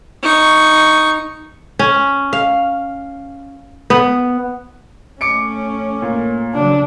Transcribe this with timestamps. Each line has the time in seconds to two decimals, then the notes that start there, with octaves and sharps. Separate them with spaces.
0.22 D#4 C#6
1.79 C#4
2.33 F5
3.90 B3
5.21 A3 C#4 D6 C#7 D7
6.02 A#2
6.54 C#3 F#3 D4